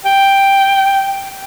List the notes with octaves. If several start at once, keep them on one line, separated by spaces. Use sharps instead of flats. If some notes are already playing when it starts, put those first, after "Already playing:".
G5